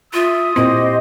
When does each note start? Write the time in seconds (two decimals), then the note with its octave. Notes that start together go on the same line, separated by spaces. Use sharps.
0.13 F4 E5 D#6
0.56 A#2 C4 E4 G4 C5 D#5